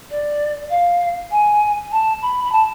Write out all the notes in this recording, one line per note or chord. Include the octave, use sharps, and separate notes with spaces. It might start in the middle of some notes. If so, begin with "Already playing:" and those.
D5
F5
G#5
A5
B5
B5
A5